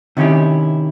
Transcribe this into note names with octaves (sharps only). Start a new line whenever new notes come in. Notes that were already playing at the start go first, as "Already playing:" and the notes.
C3 D#3 C#4 E4 G4